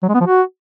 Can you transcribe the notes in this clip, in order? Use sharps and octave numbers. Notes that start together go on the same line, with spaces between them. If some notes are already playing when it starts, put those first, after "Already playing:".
F#3
G#3
B3
F3
F#4